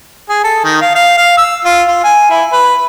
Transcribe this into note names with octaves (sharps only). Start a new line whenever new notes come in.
G#4
A4
D#3
F5
F5
F5
E6
F4
F4
G#5
E4
B4